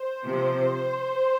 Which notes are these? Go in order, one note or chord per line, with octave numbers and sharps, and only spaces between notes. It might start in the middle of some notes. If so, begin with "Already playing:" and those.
Already playing: C5
C3 F3